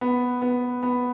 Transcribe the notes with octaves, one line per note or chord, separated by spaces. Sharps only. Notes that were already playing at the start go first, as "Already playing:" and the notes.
B3
B3
B3